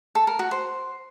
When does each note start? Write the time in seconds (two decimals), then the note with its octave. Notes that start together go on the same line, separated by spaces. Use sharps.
0.15 A4
0.27 A#4
0.39 F#4
0.51 C5